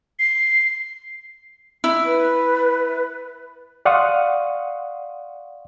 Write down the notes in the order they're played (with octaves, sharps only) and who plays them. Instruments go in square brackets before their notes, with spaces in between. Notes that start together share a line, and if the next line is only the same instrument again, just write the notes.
[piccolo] C7
[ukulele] E4
[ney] B4
[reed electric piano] D5 F5 F#5 C6 C#6 D#6